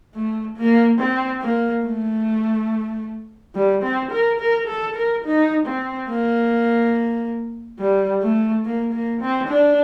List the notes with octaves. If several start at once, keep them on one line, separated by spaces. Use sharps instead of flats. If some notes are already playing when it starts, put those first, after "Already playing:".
A3
A#3
C4
A#3
A3
G3
C4
A#4
A#4
A4
A#4
D#4
C4
A#3
G3
A3
A#3
A#3
C4
D4